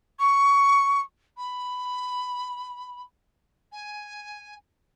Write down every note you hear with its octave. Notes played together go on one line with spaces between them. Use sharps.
C#6
B5
G#5